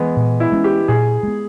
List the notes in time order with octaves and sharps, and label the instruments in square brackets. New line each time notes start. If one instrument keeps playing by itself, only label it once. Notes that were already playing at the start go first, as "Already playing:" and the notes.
Already playing: [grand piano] E3 G#3 B3
[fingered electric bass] A#2
[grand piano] E4
[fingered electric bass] G#3 C#4
[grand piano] G4
[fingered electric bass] A#2 [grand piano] G#4
[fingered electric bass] G#3 B3